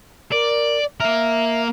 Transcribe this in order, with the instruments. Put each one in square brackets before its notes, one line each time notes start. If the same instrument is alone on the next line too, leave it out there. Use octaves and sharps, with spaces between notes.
[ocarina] A#4 [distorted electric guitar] D5
[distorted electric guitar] A#3 A#4 [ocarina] E5